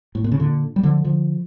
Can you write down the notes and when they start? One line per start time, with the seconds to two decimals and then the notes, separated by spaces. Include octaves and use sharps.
0.15 A2
0.24 A#2
0.32 C#3
0.40 A#2 D3
0.76 G3
0.83 D3 F3
1.04 D3 F3